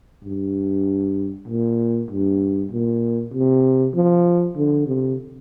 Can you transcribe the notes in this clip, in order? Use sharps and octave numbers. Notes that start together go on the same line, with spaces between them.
G2
A#2
G2
A#2
C3
F3
D3
C3